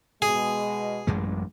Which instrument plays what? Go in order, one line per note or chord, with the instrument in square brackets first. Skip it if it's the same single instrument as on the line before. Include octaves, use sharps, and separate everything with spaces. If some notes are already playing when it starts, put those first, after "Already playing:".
[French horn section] B2 G#3 [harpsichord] G#4
[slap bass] A1 F#2 G#3